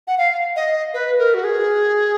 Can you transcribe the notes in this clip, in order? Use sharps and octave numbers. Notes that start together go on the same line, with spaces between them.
F#5
F5
D#5
B4
A#4
F#4
G#4